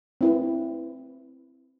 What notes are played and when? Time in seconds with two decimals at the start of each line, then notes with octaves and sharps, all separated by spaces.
0.21 C4 E4 B4